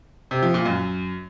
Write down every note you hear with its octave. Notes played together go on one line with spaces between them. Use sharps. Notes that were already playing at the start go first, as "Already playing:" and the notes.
C3
F3
A#2
F#2